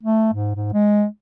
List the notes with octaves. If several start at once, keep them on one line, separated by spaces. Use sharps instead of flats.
A3
G#2
G#2
G#3